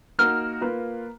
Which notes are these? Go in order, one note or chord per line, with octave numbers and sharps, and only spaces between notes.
A#3 D#4 F#4 A#4 F6
A#3 F4 B4